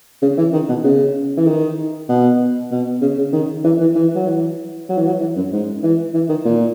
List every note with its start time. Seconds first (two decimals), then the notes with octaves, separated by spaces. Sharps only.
0.22 C#3
0.38 E3
0.53 D#3
0.69 B2
0.84 C#3
1.37 E3
1.47 D#3
2.09 B2
2.71 B2
3.02 C#3
3.18 C#3
3.33 D#3
3.64 E3
3.80 E3
3.95 E3
4.15 F#3
4.26 E3
4.89 F#3
4.97 E3
5.07 F#3
5.20 E3
5.36 F#2
5.52 G#2
5.83 E3
6.14 E3
6.29 D#3
6.45 A#2